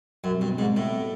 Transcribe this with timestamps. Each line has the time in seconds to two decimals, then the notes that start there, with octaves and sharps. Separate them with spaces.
0.24 F#2 B2 G3 C4
0.41 G2
0.58 G#2
0.76 A2